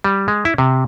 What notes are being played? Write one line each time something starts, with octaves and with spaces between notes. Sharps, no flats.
G3
G#3
E4
C3